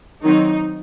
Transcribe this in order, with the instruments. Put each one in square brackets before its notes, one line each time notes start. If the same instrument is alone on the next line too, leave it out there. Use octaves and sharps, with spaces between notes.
[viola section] D#3 F#3 C4 D#4